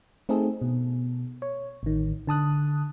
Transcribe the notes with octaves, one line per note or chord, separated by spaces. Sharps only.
A3 C4 D#4 G#4 A4
B2
C#5
A1 D#3
D3 A5 D#6 F#6